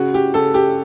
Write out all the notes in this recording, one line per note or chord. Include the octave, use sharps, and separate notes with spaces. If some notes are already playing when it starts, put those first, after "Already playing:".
Already playing: C#3 F#4
G4
C#3 A4
G4